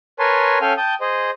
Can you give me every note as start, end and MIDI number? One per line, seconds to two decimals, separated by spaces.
0.19 0.58 70
0.19 0.58 71
0.19 0.58 73
0.19 0.58 80
0.19 0.58 81
0.19 0.58 84
0.61 0.73 61
0.61 0.73 69
0.61 0.73 77
0.61 0.73 79
0.61 0.73 80
0.61 0.73 89
0.77 0.95 79
0.77 0.95 81
0.77 0.95 87
0.77 0.95 91
1.01 1.30 68
1.01 1.30 72
1.01 1.30 75